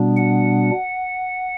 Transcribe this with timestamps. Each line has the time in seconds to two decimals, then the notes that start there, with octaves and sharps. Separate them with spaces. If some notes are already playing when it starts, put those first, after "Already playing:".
Already playing: B2 G3 B3 D4
0.17 F#5